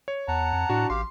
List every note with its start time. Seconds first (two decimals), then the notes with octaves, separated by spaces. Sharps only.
0.08 C#5
0.28 E2 F#5 A5 A#5
0.53 F2
0.69 A2 D4 F#4
0.90 A1 G4 F5 C6